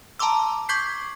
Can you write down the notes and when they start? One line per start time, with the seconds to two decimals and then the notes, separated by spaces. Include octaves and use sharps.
0.19 A5 A#5 C6 D6 E6
0.69 C#6 D6 G6 G#6 B6 C7